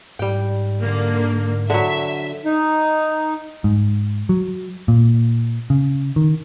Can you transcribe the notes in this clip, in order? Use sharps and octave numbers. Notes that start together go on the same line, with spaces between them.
G#2 G3 G5
D3 A#3
D3 F#3 E5
D#4
G#2
F#3
A#2
C#3
D#3